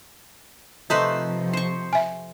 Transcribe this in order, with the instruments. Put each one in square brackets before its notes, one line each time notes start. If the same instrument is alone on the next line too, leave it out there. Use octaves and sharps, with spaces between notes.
[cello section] C3 F3 [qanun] A3 B4 C5 [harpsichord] D#4
[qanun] C5 C#6
[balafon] E5 G#5